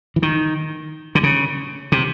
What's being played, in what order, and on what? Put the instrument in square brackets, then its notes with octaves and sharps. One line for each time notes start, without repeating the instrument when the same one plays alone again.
[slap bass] E3
D#3
D3
C#3
C3